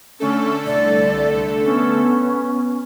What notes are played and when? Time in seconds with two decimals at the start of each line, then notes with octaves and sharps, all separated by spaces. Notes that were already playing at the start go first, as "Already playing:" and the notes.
0.20 D3 A3 C#4 A4
0.66 C2 D5
1.64 B3 C#4